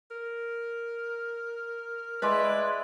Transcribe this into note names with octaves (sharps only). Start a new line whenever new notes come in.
A#4
G#3 E4 B4 D5